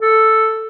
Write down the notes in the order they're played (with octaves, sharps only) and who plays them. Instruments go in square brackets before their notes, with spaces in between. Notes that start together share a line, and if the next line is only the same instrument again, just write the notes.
[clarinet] A4